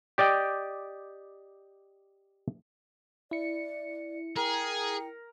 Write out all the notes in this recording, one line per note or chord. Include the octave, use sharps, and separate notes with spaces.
G4 D5 D#5 G5
E4 D5 C#7
G#4 A#4 G5